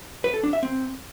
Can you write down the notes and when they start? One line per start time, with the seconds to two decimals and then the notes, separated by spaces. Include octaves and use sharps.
0.24 B4
0.34 A4
0.43 D4
0.53 E5
0.63 C4